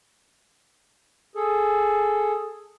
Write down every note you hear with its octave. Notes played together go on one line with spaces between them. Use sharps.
G#4 A4